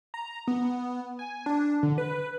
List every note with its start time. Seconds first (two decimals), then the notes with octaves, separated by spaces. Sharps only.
0.14 A#5
0.47 B3
1.19 G#5
1.46 D4
1.83 D3
1.98 B4